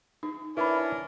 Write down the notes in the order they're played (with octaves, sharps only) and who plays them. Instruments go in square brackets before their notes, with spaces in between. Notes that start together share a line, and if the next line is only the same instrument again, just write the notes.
[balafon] D#4
[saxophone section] C#4 D4 A#4 [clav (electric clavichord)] E4 [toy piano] B4 B5